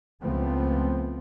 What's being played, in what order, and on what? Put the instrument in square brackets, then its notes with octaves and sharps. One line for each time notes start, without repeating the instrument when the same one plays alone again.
[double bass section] C#2 F3 A3 B3 C4